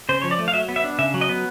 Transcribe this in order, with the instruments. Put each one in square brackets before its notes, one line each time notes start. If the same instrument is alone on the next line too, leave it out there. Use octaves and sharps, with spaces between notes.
[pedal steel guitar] C#3 C5
F3 C#5
D5
A3
F5
F#3 E5
B3
E5
D4
C#3 E5
F#3
D#5
B3